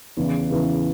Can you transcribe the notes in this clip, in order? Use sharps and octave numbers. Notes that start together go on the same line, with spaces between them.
E2 C#3 E3
E2 C#3 E3